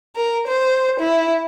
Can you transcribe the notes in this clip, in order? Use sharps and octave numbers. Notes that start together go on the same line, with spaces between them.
A#4
C5
E4